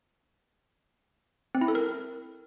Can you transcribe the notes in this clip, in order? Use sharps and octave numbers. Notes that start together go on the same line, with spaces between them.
C4
E4
A4
A#4